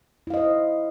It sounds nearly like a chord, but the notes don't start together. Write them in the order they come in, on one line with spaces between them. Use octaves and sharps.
E4 F5 D#5 C5